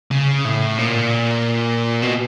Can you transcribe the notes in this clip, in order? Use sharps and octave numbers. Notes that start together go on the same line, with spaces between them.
C#3
A2
A#2
B2